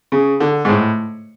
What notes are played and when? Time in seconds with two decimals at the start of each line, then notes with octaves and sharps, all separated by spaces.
0.12 C#3
0.40 D3
0.65 G#2
0.69 A2